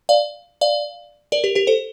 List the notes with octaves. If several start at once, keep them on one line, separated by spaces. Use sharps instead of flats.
D5 F5
D5 F5
A#4 D5
G4 A#4
G4 A#4
A4 C5